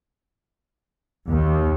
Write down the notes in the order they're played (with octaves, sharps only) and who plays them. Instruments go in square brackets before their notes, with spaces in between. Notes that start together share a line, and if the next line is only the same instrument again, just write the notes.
[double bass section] D#2